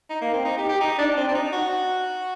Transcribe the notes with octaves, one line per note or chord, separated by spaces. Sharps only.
D#4
A#3
C4
D#4
G4
G4
D#4
D4
D4
C4
D4
D#4
F#4